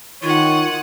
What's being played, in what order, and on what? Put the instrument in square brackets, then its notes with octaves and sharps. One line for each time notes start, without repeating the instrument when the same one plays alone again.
[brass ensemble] D#3 [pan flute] F4 [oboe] C#5 [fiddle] F#5 D#6